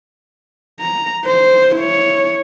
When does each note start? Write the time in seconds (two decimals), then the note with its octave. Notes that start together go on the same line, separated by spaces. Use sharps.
0.80 A#5
1.25 C5
1.76 E4 C#5